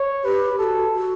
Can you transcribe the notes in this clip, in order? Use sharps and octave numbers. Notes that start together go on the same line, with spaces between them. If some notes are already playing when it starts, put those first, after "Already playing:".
Already playing: C#5
G4 B4
F#4 G4 A4
F#4